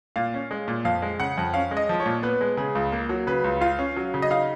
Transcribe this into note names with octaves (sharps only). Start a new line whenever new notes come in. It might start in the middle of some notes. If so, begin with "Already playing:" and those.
A#2 F5
C#4
G#3
A#2
F2 F5
G#3
C#3 F#5
F2
C#4 F5
G#3
D#5
F3
C#5
A#2
B3 B4
G#3
C#3 G#4
C#2
A#3
F#3
C#3 B4
C#2
F4 F5
C#4
F#3
C#3
D#5
D#4 F5